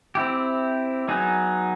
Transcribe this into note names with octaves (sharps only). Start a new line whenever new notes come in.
C4 E4 G4
F#3 B3 D#4 G#4